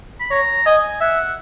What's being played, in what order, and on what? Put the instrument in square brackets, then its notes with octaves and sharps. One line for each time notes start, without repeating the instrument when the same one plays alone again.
[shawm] B5
[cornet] C#5 [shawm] A#5
[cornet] D#5 [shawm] G#5
[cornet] E5 [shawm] F#5